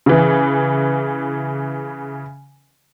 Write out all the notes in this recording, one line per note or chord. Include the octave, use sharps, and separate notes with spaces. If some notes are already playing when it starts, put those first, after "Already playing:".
C#3 E3